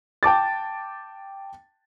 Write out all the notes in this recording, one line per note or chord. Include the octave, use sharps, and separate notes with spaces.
G5 A5 D6 A6